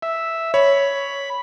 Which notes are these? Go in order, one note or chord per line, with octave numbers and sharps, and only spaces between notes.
E5
C#5 B5